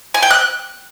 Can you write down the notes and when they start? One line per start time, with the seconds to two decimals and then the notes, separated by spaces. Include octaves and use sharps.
0.14 G#5
0.22 G5
0.31 F#6